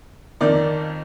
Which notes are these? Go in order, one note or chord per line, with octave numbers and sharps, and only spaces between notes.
F2 D#3 A#3 D#4 D5